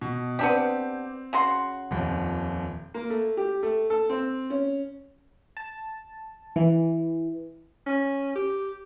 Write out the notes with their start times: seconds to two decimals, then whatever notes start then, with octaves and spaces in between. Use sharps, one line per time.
0.01 B2
0.39 B3 C4 D4 G4
1.33 C#3 F#4 C6
1.91 D#1 F2
2.94 A#3
3.10 A3
3.37 G4
3.63 A3
3.90 A4
4.09 C4
4.50 C#4
5.57 A5
6.56 E3
7.86 C#4
8.35 G4